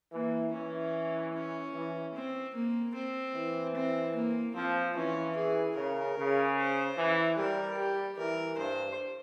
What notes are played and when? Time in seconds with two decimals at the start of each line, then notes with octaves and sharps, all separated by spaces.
0.12 E3 A#3
0.53 E3 C#4
1.33 C#4
1.74 E3
2.14 C4
2.55 A#3
2.94 C4
3.35 E3
3.75 C4
4.15 A#3
4.55 F3 C4
4.95 E3 C#4
5.36 G#4
5.76 C#3 A#4
6.17 C#3
6.57 C5
6.97 E3
7.37 G3 A#4
7.78 G4
8.17 E3 A#4
8.57 G2 C5